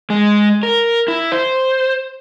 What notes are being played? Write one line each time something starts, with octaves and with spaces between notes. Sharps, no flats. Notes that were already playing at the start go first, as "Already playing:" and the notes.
G#3
A#4
E4
C5